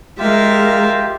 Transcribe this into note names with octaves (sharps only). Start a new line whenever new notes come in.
G#3 F4 G4 A#4 E5 F5